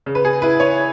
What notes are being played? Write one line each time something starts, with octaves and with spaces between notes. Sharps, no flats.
C#3
B4
G#4
E4 B4
C#5